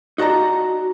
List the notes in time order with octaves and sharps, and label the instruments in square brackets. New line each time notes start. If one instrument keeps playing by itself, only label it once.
[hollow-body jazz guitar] D#4 F#4 D5 A5 A#5